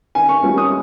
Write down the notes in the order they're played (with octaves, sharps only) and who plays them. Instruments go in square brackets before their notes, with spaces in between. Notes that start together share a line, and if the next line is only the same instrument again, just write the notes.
[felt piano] D#3 [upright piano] G#5
[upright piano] C#6
[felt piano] G3 A#3 C#4 F4
[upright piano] D#6